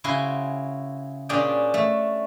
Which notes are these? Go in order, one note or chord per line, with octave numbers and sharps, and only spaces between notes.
C#3 E4 F#4 G#5 C6
A#2 C#4 D4 G4 G#4 G5
A3